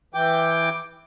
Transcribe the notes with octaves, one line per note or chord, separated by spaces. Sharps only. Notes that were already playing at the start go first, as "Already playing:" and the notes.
E3 G5 D6